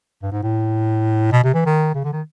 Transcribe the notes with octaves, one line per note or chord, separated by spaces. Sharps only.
G2
G#2
A2
B2
C3
E3
D#3
C#3
D3
D#3